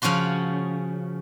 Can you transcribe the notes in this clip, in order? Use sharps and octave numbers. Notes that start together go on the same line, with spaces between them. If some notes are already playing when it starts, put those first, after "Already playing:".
C#3 F3 C#4 F#4 C6